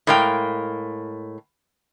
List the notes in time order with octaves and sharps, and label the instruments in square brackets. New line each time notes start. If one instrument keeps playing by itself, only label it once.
[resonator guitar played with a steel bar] A2 G#3 A#4 F5 G5